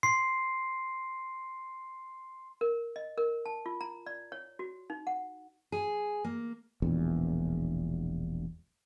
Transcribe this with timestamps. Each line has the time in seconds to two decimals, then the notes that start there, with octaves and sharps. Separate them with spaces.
0.03 C6 C7
2.61 A#4
2.96 D#5
3.18 A#4
3.46 A5
3.66 F4
3.81 A#5
4.06 D5
4.32 C#5
4.59 F#4
4.90 D#4
5.07 F#5
5.72 G#4
6.24 A#3
6.82 E1 A#1 E2